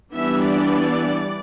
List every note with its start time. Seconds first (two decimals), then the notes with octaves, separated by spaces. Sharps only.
0.14 E3 G3 B3 D4 E5
0.44 D5